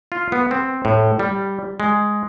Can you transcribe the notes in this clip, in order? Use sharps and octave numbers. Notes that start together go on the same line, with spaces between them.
F4
B3
C4
A2
G3
G#3